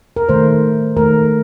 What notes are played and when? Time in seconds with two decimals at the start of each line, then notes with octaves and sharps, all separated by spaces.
0.17 A#4
0.29 D#3 A3 C5
0.97 D#3 A3 A#4